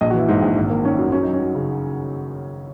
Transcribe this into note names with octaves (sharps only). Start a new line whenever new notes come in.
A#1 D#5
F#4
E3
E4
G#2 D#4
A#1
G#1
A#3
D#3 C#4
F#2
F#2 C#4
F#3 D#4
C#4
F#3
C#3